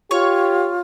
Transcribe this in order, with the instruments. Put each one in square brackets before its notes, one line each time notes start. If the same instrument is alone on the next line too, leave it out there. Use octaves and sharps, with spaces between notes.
[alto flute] F4 [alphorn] G4 [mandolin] C#5